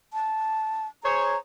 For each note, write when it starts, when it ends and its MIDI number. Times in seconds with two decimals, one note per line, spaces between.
0.13 0.87 81
1.03 1.35 68
1.03 1.35 72
1.03 1.35 73
1.03 1.38 82